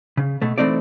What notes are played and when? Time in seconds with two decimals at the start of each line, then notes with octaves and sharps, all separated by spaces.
0.17 C#3
0.42 B2 A3
0.58 E3 A3 C4 D#4 D5